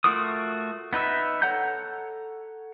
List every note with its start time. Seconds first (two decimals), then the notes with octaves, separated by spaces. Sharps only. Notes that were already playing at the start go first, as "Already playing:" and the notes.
0.04 A3 F4 F#4 A#4 D#6
0.93 B3 D#4 B4 E5
1.42 A4 C#5 F#5 A#5 G6